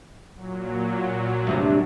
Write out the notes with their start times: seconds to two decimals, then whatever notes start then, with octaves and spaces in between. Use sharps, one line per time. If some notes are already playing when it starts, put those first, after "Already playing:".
0.36 A#2 F#3
1.47 D2 G2 C3 D4